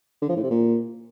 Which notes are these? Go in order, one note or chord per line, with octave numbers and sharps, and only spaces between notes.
D3
F3
A2
C3
A#2